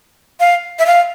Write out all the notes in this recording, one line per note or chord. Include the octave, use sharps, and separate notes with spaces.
F5
E5
F5